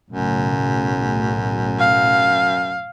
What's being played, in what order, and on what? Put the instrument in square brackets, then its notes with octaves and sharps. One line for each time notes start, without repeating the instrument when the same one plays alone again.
[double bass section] B1 A2 C#3 [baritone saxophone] F#2
[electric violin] F5